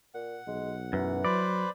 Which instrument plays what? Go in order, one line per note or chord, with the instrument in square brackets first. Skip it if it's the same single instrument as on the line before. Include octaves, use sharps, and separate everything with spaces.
[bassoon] A#2 [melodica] F#5
[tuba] B1 [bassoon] G#3
[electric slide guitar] F#2 [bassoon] E3
[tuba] F#3 [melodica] B4 C5 B5 [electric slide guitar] D5